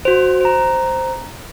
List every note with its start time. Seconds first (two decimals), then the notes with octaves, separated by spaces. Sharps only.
0.05 F#4 C5
0.41 C5 A#5